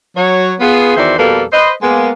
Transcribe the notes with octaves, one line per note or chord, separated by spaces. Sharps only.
F#3 C#5
B3 F4 G#4
E2 D#3 F#4 C5 D5 E5
F2 B2 G3 A#3 A4 B4
B4 C5 D#5
G#3 A#3 B3